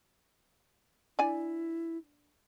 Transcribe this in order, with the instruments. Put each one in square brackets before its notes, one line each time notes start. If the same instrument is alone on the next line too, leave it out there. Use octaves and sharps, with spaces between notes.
[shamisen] D4 D5 G#5 [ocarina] E4